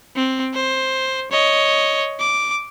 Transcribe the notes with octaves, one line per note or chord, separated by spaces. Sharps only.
C4
C5
C#5 D#5
D6